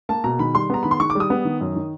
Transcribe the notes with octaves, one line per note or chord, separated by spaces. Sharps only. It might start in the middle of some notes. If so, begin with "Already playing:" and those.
A#3 A5
B2 A#5
D#3 B5
G3 C6
B3 A#5
D#3 B5
C6
D#3 C#6
D6
G3 D#6
B3
D#3
F#2
D#3